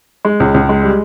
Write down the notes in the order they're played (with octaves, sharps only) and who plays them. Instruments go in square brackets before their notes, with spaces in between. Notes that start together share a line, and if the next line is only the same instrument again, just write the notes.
[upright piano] G#3
C#2
C#2
G#3
G3